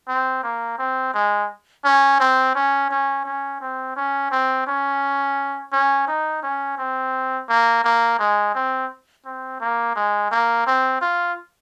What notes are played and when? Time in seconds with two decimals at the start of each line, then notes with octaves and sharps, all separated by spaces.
0.08 C4
0.43 A#3
0.78 C4
1.14 G#3
1.84 C#4
2.20 C4
2.55 C#4
2.90 C#4
3.25 C#4
3.61 C4
3.96 C#4
4.31 C4
4.67 C#4
5.72 C#4
6.07 D#4
6.43 C#4
6.78 C4
7.49 A#3
7.84 A#3
8.19 G#3
8.54 C4
9.25 C4
9.60 A#3
9.96 G#3
10.31 A#3
10.66 C4
11.01 F4